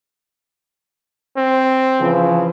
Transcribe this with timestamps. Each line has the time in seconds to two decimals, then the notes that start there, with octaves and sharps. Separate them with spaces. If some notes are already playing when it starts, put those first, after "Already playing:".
1.37 C4
2.00 C#3 E3 F3